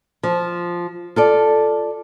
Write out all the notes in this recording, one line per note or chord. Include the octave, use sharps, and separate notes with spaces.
F3
F4 A4 D5